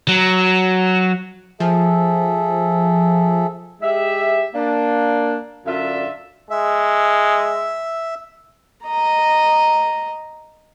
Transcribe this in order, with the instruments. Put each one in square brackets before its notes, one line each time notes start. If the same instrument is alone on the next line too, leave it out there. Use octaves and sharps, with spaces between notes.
[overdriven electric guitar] F#3
[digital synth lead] F3 [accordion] G#4 A4 E5
[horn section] G#3 G4 E5
A#3 D4
F#2 D3 D4 F4 E5
[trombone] G#3 [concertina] E5
[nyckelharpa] D#5 A#5